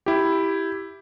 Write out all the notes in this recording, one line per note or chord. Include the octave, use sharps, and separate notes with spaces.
E4 G4